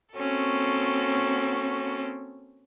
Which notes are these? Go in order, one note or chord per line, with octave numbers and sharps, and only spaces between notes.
A#3 C4 C#4 F#4 A4